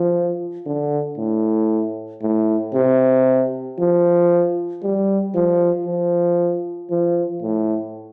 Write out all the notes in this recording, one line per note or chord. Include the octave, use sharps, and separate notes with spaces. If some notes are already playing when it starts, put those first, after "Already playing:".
Already playing: F3
D3
A2
A2
C3
F3
G3
F3
F3
F3
A2